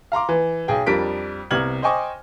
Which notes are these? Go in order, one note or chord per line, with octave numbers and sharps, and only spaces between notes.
F5 A#5 C6 D6
E3
B1 G#4 G5
F2 G3 D4 A#4 B6 D7
C2 C3 B3 F6 G#6 F#7
C5 D#5 G5 G#5 C#6 D6